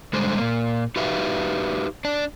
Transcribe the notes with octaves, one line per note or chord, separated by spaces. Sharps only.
D3 G3 G#3 C5
A#2 A#3
D#4 F#4 G4 B4 E5 F5
D4 D5